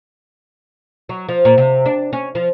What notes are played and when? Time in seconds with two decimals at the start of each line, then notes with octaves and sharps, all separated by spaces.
1.09 F#3
1.29 F3
1.45 A#2
1.58 C3
1.86 D4
2.13 C#4
2.35 F3